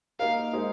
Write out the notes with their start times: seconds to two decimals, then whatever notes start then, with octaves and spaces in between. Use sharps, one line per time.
0.19 A#3 D#4 A#4 F5
0.53 G#3 D#4 G#4 C5